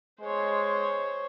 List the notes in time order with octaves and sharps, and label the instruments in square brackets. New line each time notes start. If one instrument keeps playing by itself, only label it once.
[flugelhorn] G#3 [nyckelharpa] C5 C#5